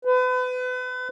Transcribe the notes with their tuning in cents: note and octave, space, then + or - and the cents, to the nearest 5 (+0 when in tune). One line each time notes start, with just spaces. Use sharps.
B4 +35